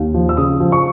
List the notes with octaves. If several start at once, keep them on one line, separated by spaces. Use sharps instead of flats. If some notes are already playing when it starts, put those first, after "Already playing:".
Already playing: D#2
F3
E6
C#3 D#6
F3
C#6